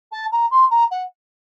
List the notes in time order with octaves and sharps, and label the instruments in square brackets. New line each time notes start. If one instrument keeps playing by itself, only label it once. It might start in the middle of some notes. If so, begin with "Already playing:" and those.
[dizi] A5
A#5
C6
A#5
F#5